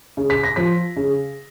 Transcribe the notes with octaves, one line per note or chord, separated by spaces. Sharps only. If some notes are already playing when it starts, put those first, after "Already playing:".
C#3
B6
A#6
F3 B6
C#3